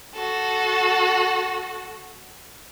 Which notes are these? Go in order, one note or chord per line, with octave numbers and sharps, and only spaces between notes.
F#4 A4